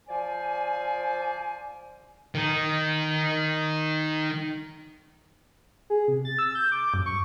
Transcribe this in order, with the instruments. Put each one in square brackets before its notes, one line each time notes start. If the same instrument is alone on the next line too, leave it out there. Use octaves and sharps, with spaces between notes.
[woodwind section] F3 C5 D5 G#5
[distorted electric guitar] D#3 D#4
[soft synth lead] G#4
C3
A6
E6
G6
D6
F#2
C#6